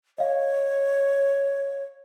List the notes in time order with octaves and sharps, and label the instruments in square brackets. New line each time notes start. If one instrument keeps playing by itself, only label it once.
[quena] C#5 [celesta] D#5 F5